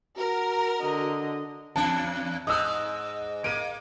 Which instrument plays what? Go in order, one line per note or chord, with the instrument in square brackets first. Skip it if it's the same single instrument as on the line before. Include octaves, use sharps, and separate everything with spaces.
[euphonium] F#4 [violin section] A#4
[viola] D3 D#5
[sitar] E2 D4 [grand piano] A5
[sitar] G#2 [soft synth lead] D#5 [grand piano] D#6 E6
[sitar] A#3 [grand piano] D7 D#7